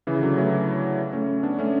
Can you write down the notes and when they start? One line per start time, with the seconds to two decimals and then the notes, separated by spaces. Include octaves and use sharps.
0.07 C#3 E3
0.22 D3 F#3
0.37 F#3 A3
1.13 A3 C#4
1.43 B3 D4
1.59 A3 C#4